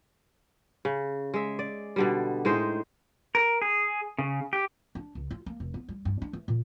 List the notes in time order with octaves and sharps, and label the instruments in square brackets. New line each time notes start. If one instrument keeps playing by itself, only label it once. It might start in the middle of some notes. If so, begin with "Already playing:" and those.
[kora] C#3
G#3 E5
D5
B2 D3 G3
A2 G#3 D#4 C5
[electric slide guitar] A#4
G#4
C#3
G4
[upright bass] D4
C#2
F4
A#3
F1
B3
G3
G2
D4
E3
A#2